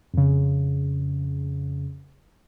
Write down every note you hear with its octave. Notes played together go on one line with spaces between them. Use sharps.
F2 C#3